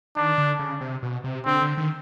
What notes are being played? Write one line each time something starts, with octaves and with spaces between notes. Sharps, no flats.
D#3 D4
D3
C#3
C3
B2
C3
D3 C4
D3
D#3